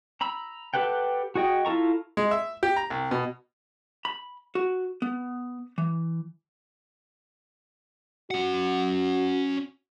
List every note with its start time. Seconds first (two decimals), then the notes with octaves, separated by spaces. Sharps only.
0.21 A#5 B5 E6
0.74 G4 A4 B4 F#5 G5
1.35 F#4 G#4 D#5 G5
1.65 E4 F4 A4 A#5 C#6
2.17 G#3
2.31 E5
2.63 G4
2.76 A#5
2.90 C2
3.11 B2
4.05 B5
4.55 F#4
5.02 B3
5.78 E3
8.31 C#4 F#4 F#5